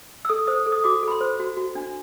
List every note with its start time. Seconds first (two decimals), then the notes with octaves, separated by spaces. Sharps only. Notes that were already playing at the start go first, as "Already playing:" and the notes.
0.25 E6
0.29 A4 D#6
0.47 C5 D#6
0.66 A4
0.72 D#6
0.84 F#4 D6
1.03 A4 B5
1.11 C6
1.21 C5
1.40 F#4
1.57 F#4
1.75 D4